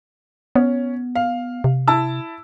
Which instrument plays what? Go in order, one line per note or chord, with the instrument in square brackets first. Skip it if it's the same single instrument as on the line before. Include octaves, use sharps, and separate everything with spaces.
[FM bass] B3 [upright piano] C#4
[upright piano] F5
[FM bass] C3
[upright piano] E4 A5 E6